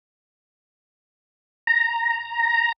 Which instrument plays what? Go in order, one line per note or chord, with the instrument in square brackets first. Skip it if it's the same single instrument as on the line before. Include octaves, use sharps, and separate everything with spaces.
[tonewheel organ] A#5